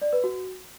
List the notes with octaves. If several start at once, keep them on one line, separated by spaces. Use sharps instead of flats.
D5
B4
F#4